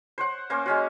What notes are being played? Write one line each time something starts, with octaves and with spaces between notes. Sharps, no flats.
C5 C#5 F#5
A#3 C#4 C5
G#3 C#4 F#4